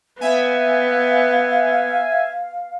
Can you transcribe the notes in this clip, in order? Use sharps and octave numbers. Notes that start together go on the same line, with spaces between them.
B3 E5 F5 G#5